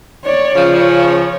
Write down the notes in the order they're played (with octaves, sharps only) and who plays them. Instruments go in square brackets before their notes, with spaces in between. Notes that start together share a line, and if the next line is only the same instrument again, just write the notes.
[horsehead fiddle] C#5 D5
[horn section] C#3 F3 [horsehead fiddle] C#5